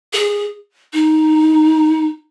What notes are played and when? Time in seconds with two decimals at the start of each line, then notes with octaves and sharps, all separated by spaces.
0.13 G#4
0.93 D#4